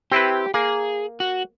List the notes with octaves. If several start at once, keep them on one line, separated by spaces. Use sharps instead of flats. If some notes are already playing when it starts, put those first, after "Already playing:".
C4 E4 G4 B4
A#3 G#4
F#4